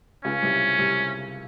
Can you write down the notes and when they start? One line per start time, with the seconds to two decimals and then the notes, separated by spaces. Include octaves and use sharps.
0.24 C#2 C#3 C#4
0.43 C2 C3
0.78 C2 C3